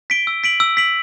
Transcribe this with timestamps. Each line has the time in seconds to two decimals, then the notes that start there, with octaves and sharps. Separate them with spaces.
0.10 B6 D7 G7
0.27 E6
0.44 B6 D7 F#7
0.60 E6
0.77 B6 D7 F#7